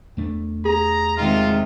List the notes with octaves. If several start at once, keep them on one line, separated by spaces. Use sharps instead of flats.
E2 A3 D4
G#4 A#5
C3 D#3 G#3 F4